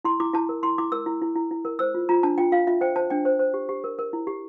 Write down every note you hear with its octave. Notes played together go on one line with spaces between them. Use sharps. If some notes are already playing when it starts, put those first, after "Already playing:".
E4 C6
E4 D6
E4 A5
A#4
E4 C6
E4 D6
A#4 E6
E4
E4
E4
E4
A#4
C5 E6
F4
F4 A#5
D4 A5
F4 G5
F4 F5
F4 E5
C5 G5
C5 A5
D4 G5
C5
C5
G4
G4
A#4
A#4
E4
G4